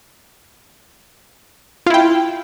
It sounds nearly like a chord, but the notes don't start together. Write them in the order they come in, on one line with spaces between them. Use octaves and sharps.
F4 E4 G5